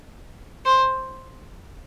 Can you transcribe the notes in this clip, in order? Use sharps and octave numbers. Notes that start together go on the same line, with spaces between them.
C5